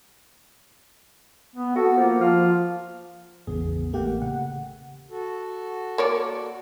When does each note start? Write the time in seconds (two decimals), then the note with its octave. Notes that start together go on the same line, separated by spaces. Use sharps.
1.56 B3
1.76 F#4 A4
1.97 F3 A#3
2.21 F3 F4
3.47 A1 E2 C#3 B3 G#4
3.93 A1 A3 A#3 G4 F#5 G5
4.22 C#3 F#5
5.10 F#4 A4
5.98 A#3 C#5 D5